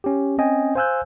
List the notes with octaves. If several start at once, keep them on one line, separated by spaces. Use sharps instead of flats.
C#4 G4
C4 C#4 D#5 G5 G#5
C5 F5 G#5 E6 F#6 G6